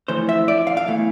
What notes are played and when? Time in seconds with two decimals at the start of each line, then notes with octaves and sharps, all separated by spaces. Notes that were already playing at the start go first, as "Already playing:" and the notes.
0.08 F2 E3 A3 C5
0.29 E5
0.48 D5
0.67 F5
0.77 F5
0.87 E2 E3 A3